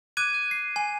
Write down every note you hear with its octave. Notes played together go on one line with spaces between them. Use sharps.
D6 F#6 G#6 D#7
F#6
C7
G#5